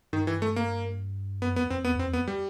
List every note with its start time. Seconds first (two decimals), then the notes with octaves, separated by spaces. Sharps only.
0.13 G2 D#3
0.27 E3
0.42 A3
0.56 A#3
1.41 F#2 B3
1.56 F2 B3
1.70 F2 C4
1.85 E2 B3
1.96 F2 C4
2.07 E2
2.13 B3
2.17 F2
2.28 G3